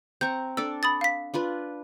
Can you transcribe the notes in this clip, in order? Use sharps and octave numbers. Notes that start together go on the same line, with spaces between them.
C4 A#5 C#6 G6
D4 A4 D5 E6
B5 D#6 A6
F5 B6
D4 F4 B4